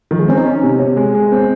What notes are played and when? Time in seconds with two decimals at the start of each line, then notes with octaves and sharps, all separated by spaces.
0.11 D#3 F3
0.19 G#3
0.28 C4 C#4
0.37 D#4
0.46 C#4
0.63 C3
0.79 C3 C#4
0.97 G#3
1.14 G#3
1.32 C4